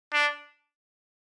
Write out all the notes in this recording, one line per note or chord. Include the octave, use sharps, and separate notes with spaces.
D4